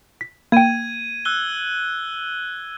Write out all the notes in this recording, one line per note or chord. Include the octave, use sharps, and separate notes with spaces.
B6
A#3 G5 G#6 D#7
E6 F#6 G7